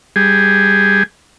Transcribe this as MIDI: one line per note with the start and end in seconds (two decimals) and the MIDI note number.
0.16 1.03 55
0.16 1.03 68